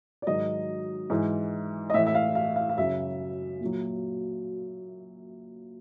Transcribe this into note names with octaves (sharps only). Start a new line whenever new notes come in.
D5
G#2 D#3 F#3 D#5
G#2 E3
D#5
A2 E3 E5
E5
F5
F5
F5
F5
F#2 C#3 F#3 E5
A#2 F#3